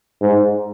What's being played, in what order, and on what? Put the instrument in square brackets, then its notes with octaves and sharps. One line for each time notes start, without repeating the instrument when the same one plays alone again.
[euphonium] G#2